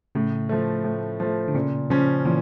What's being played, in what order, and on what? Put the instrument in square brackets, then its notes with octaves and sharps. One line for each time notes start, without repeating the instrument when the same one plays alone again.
[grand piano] A2 [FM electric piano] C#3
[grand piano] F3 A3
A2
F3 A3
[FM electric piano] D3
[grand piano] A#2 [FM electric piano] C#3
[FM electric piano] C#3 [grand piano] F3 C#4
[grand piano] A#2 [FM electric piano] E3